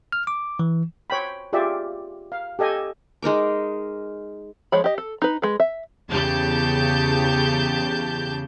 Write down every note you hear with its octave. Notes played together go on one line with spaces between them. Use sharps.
F6
D6
E3
C5 C#5 G5 B5
F4 G4 G#4 D5 E5
F5
G4 A4 D#5 G#5
G#3 D#4 A#4 D6
F3 G#3 C#5 B5
G4 D#5
A4
D#4 B4
G#3 B4
E5
E2 C#3 G4 A5 G6